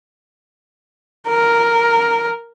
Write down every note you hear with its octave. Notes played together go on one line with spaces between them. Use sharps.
A#4